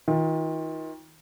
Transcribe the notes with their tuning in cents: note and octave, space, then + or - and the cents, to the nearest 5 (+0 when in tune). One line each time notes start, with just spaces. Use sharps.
D#3 +40 F4 +20